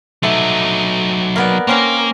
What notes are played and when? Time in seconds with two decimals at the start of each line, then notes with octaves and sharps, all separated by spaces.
0.23 F#3 A3 D#4
1.36 A#3 B3 D5
1.67 A#3 C4 C#4 A#4